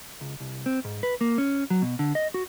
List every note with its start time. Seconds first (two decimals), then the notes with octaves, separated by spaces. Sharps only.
0.21 C#2
0.40 C2
0.66 C4
0.85 G#2
1.03 B4
1.21 A#3
1.38 C#4
1.70 F#3
1.82 B2
1.99 D3
2.15 D#5
2.34 F#4